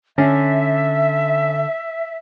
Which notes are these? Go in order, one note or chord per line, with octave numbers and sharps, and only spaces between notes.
D3 C#4 E5